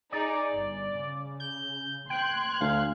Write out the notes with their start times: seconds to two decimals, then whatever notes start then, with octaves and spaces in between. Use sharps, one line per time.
0.12 D#4 G#4 D5
0.53 G1
0.96 C#3
1.40 G6
2.10 G5 C6 F#6 G#6
2.61 D2 F5